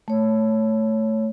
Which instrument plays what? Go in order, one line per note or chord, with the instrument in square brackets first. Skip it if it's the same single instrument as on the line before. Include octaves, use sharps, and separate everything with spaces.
[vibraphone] A3 C#5